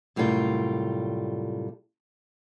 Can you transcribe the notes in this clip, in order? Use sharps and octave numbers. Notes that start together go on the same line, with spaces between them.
F#2 A2 C3 G3 F4 A#4